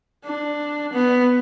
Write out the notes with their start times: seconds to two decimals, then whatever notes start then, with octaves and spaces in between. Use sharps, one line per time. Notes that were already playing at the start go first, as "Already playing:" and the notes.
0.25 D4
0.93 B3